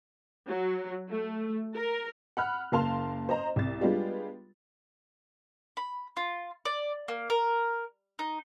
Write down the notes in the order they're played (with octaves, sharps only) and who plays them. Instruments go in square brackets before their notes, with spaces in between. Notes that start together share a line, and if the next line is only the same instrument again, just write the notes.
[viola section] F#3
A3
A#4
[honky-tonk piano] F#5 B5 F6 F#6
F#1 A#3 F5 A5 C6 F7
C5 D#5 A#5
C2 A6
G3 G#3 B3 D4 F4 G4
[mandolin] B5
F4
D5
A#3
A#4
D#4